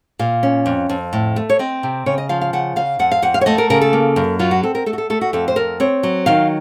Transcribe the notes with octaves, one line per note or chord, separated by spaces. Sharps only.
A#2 F5
C#4
F2
F2
A2
A3
C#5
C4 D#5
C3
C#3 C#5
D#5
F3 F5
F5
C#3 F#5
C#3 F5
F2 F#5
F5
F2 F#5
F5
C#5
A3 D#5
A#4
C#3 A#4
A4
A#3
F#2
F#3 F4
F#4
C4 A4
A#4
A3 A4
F#4
A4
A3 A4
F#4
F2 A4
C5
F2 A#4
C4 C#5
F#3
D#3 F5